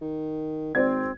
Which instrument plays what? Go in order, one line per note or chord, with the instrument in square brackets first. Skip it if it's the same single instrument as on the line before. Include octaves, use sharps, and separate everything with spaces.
[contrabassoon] D#3
[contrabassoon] G#1 [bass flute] C4 [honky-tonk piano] C5 D5 G#6